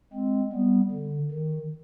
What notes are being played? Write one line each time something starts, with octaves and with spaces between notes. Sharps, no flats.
G#3 C4
G3 B3
D3
D#3